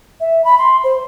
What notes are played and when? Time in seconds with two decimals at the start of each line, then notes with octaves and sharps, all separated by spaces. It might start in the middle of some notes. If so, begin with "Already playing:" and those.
0.20 E5
0.44 B5
0.58 C6
0.84 C5